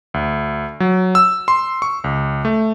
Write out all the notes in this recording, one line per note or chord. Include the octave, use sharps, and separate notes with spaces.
D2
F#3
E6
C6
C#6
C#2
A3